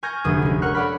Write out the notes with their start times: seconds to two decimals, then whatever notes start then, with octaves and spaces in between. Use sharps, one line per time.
0.03 G#5 C#6 F6 G6 G#6 A#6
0.24 F1 D2 D#6
0.42 G#3 C#4
0.62 A#4 F#5 C#6 F6 F#6
0.75 A4 C#5 D5 F#5 B5